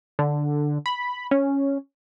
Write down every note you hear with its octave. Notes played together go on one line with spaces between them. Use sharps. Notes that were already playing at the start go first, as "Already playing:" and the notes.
D3
B5
C#4